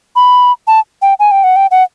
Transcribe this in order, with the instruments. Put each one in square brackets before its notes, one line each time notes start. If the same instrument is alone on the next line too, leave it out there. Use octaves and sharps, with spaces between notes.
[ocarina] B5
A5
G5
G#5
G5
F#5
G5
F#5